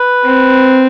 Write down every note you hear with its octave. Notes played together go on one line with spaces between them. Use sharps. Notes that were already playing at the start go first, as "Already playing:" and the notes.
Already playing: B4
C4